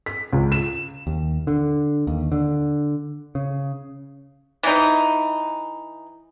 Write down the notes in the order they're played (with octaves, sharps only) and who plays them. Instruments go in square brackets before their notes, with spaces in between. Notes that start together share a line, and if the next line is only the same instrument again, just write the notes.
[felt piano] B6
C#2
E7
[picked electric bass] D#2
D3
D#2
D3
C#3
[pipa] E3 D#4